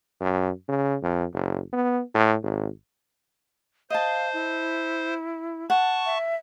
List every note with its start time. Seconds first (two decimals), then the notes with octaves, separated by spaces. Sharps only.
0.20 F#2
0.69 C#3
1.02 F2
1.33 F#1
1.73 B3
2.15 A2
2.43 G#1
3.90 C5 D#5 F5 A5
4.33 E4
5.70 F#5 A5 C#6
6.06 E5